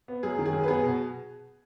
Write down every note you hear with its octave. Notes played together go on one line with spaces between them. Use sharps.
B3
F#2 G#4
D#3
G#4
F#2
B4
B3 G#4
B2